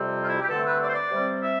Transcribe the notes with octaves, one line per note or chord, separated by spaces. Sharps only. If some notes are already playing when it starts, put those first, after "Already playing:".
Already playing: F2 C3 G3 C4
F4
E4
G4
G2 D3 A3 C4 A4
B4
D5
C5
D5
C3 G3 C4
E5